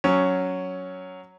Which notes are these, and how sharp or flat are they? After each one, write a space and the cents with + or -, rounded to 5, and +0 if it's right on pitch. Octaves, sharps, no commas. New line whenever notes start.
F#3 +0 C#4 +0